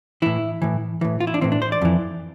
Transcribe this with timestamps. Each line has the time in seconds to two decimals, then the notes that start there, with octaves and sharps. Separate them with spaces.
0.22 A2 E3 E4
0.62 A2 E3
1.01 A2 E3
1.20 F4
1.27 E4
1.34 D4
1.41 A2 E3 C4
1.52 D4
1.62 C5
1.72 D5
1.82 F2 E3